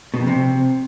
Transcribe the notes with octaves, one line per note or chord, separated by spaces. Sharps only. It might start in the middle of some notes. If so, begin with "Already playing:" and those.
B2
F2
C3